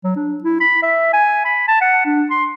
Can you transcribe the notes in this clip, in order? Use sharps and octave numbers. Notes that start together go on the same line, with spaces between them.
F#3
D4
E4
B5
E5
G#5
B5
A5
F#5
D4
C6